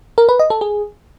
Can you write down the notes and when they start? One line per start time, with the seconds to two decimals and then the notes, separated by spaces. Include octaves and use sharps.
0.18 A#4
0.29 B4
0.39 D#5
0.50 A4
0.61 G#4